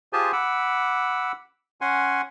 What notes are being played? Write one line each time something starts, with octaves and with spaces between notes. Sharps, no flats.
F4 G4 G#4 C5 G#5 A5
F#5 B5 D6 E6
C#4 F#5 G#5 C6